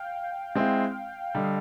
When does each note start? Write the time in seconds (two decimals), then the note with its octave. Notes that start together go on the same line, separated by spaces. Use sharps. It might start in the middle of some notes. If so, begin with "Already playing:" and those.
Already playing: F5 G5
0.55 G#3 C4 E4
1.35 D3 G3 D#5 F5